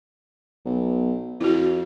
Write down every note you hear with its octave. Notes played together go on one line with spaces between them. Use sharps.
B1
F2 E4 F#4